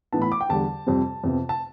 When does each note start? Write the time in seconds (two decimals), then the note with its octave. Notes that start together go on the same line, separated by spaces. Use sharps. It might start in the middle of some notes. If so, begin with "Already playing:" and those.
0.13 A2 E3 B3 A5
0.22 B5
0.32 D6
0.41 G5
0.49 E2 D3 G3 A5
0.86 F2 C3 G3 C4
1.24 F2 C3 F3 B3
1.49 A5